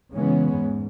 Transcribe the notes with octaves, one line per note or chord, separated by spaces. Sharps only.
C#3 E3 G#3 B3 C#4
E2 G#2